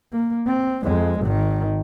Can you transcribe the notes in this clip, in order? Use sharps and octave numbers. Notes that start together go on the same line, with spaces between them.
A#3
C4
F2 G#3
G#1 D#3